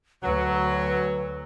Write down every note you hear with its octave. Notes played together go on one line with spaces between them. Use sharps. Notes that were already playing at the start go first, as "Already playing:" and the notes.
D2 F#3 B4